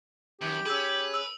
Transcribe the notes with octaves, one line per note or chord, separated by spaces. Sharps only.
F#2 D#3 G4
C#4 G#4 B4 E6 F#7
E6 F#7